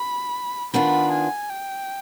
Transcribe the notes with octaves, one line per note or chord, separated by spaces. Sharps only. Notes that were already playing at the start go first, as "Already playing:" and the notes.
Already playing: B5
D#3 B3 D4 F4 B5
G#5
G5